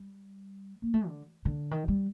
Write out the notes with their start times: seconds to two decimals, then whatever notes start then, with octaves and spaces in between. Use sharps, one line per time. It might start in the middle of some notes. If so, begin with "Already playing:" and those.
Already playing: G3
0.82 A#3
0.94 A3
1.07 D3
1.45 D3
1.71 D#3
1.88 G3